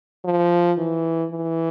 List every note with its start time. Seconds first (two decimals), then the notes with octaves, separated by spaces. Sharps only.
0.24 F3
0.78 E3
1.31 E3